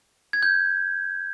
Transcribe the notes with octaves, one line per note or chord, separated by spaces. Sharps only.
G#6
G6